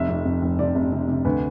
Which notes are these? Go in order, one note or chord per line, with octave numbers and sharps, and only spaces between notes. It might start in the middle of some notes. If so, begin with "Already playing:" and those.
Already playing: F1 E5
F2
F2
F1
C3 D5
F1
C3
C3
D2 B4